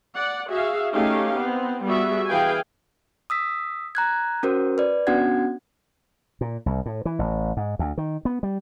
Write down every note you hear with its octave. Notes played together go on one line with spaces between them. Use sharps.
D5 F#5
F#4 G#4 E5 F5
A3 C#4 D#4 G4 F5
B3 C4
G3 B3 F#4 G#4 E5
E3 G#4 B4 F5 G5 G#5
D#6 E6 B6
A#5 F#6 G#6
C#4 F#4 A#4 C5
B4 D5
B3 C#4 D4 F#4 F#5 G#6
A#2
C2
A2
E3
A1
G#2
D2
D#3
B3
G3